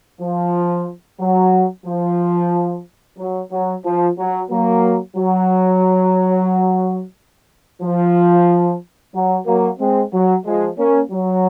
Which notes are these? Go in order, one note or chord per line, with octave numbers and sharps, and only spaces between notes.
F3
F#3
F3
F#3
F#3
F3
F#3
F#3 A#3
F#3
F3
F#3
F#3 A#3
G#3 C4
F#3
F3 G#3
A#3 C#4
F#3